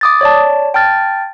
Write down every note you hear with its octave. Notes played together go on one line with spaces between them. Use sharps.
D6 D#6 A6
C#5 D5 A5
G5 A5 F6 A6